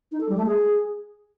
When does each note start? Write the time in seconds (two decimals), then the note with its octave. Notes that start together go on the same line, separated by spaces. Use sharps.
0.12 D#4
0.20 A4
0.29 G3
0.38 A3
0.46 G#4